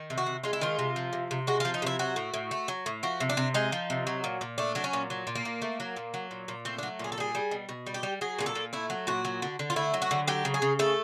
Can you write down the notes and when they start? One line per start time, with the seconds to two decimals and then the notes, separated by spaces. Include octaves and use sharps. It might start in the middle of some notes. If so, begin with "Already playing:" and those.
Already playing: D#3
0.10 C3
0.18 F#4
0.26 C3
0.44 G#3 F4
0.53 E4
0.61 D#3 F4
0.79 C3
0.96 F3
1.13 C3
1.31 C3
1.47 G#3 F#4
1.60 F4
1.65 F3
1.74 D#4
1.82 C3 E4
1.99 F#3 F#4
2.16 A2
2.34 A2
2.51 A3
2.68 F#3
2.86 A2
3.03 F3 F#4
3.20 C3
3.29 D4
3.37 C3
3.54 G#3 D#4
3.72 F3
3.90 C3
4.07 F#3
4.24 A#2
4.41 A#2
4.58 A3 D4
4.75 F#3 D4
4.84 C#4
4.93 A#2
5.10 F#3
5.27 A#2
5.35 A#3
5.45 A#2
5.62 A3
5.80 F#3
5.96 A#2
6.14 F#3
6.31 A#2
6.48 A#2
6.65 A3 C4
6.79 D4
6.83 F#3
6.99 A#2 G#4
7.12 A4
7.18 G3 G#4
7.35 G3
7.51 B2
7.69 B2
7.86 G3
7.94 G4
8.03 G3
8.21 F#3 G#4
8.39 A#2 G#4
8.46 A4
8.55 A#2
8.73 A3 E4
8.90 F#3
9.07 A#2 F#4
9.25 F#3
9.42 D3
9.59 D3
9.70 F4
9.76 A3 E4
9.94 F#3
10.02 F#4
10.11 D3
10.27 F#3 G4
10.45 C#3
10.54 G#4
10.62 C#3
10.79 A3 A4